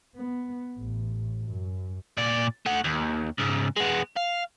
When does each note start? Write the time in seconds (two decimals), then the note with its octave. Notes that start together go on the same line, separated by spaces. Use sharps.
0.15 B3
0.78 A1
1.46 F#2
2.18 A#2 D5
2.66 A3 F#5
2.84 D#2
3.39 C#2 G#2
3.77 G#3 B3
4.16 F5